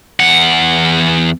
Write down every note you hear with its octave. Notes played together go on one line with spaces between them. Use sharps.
E2 F#5